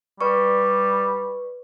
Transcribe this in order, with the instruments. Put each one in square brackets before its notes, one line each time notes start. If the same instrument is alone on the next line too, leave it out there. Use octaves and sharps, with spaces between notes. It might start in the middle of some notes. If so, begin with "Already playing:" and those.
[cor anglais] G3 [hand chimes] B4 D5 C#6